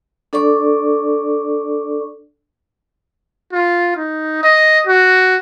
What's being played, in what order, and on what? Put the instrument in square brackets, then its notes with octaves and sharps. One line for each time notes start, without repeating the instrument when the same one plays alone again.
[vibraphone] D4 A4 D5 C#6 D6
[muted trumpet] F4
D#4
D#5
F#4